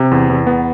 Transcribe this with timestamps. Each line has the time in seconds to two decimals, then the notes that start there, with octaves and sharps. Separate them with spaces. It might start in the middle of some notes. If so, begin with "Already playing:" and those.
Already playing: C3
0.11 E2
0.29 E2
0.47 B3